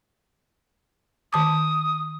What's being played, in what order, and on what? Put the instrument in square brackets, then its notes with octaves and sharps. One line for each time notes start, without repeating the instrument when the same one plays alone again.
[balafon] D#3 A5 D6 [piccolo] D#6